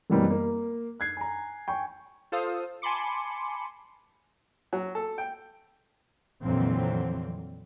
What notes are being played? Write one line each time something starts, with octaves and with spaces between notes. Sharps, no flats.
F#2 B2 E3 G3 A#3 C4
A#3
F#6 G#6 C7
G#5 A#5
G5 G#5 C#6
F4 A4 C5 F5 D#6
G#5 A5 B5 C6 D6 C#7
F#3
A4
G5
F2 A#2 D3 E3 F#3 C4